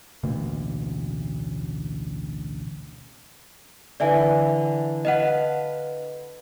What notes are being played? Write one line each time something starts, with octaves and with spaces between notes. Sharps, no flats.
A1 D2 B2 A#3
D3 E3 D5 E5 G#5
B4 D#5 F5 F#5 A5